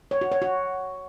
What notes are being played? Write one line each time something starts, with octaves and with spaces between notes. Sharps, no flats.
C#5
F#4
C#5
F#4